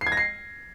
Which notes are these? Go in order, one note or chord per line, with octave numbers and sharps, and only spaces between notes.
C7
G#6
A#6
C7